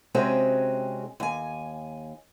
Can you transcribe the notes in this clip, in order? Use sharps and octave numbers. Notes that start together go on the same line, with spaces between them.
C3 G#3 C4 C#4 F#4 G#4
D#2 G#5